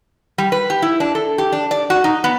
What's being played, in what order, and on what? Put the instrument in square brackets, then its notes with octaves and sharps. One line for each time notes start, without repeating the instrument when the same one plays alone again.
[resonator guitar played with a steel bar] G3
B4
G4
E4
D4
A4
G4
D4
D5
F#4
D#4
B3